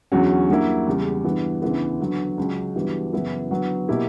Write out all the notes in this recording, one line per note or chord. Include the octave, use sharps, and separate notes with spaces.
E2 D3 F#3 C#4 F#4
G2 F#3 A#3 E4
E2 C#3 G3
G2 E3 B3
D2 C#3 E3 B3
D3 F#3 B3
C#2 C#3 F#3
G2 E3 G3 B3 F#4
F#2 C#3 E3 B3 E4
D3 F#3 B3
B2 A#3 E4 G4